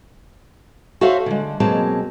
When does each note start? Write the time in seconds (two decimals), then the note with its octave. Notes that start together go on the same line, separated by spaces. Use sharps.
1.01 F#4 A4 C5 C#5 E5 F5
1.26 D3 G#3
1.60 B2 F#3 G#3 A#3 C4 A5